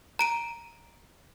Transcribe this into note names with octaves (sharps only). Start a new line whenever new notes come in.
A#5 D7 D#7